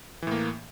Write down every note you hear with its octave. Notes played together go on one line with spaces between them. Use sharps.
A2 E3 A#3